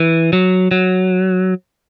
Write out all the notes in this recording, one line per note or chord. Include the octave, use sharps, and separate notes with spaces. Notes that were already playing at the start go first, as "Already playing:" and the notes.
Already playing: E3
F#3
F#3